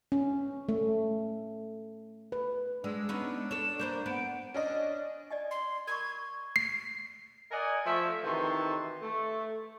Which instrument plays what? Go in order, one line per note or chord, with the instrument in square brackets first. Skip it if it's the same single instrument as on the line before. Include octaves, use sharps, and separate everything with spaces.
[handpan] C#4
A3
B4
[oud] G#3 [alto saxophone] D4 [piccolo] E6
[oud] B3 C#4 D#4
[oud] A4 C#5 [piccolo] E7
[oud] A#3 B4 C5 [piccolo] G6
[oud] B3 [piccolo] D7
[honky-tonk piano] C#4 D4 D#5
[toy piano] D5 D#5 G#5
[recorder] C6
[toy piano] A#4 B5 C#6 [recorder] G#6
[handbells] C7
[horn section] A#4 D5 D#5 F#5 G#5
F3 A3 E5
C3 D#3 E3 F#4 A4 C6
A3